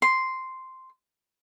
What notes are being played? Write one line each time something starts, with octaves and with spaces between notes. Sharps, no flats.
C6